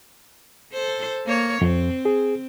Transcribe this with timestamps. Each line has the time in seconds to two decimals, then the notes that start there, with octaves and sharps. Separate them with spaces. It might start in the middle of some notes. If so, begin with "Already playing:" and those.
0.73 A4 C5
1.26 A#3 C#5
1.61 F2 C4
2.05 G#4